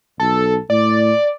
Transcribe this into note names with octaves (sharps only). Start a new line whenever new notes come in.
B1 A4
A2 D5